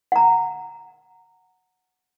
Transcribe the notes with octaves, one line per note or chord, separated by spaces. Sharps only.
F#5 A#5